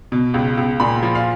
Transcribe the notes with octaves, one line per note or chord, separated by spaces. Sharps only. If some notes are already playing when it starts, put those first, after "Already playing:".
B2
C#2
C#2
A#2 B5
F3
F5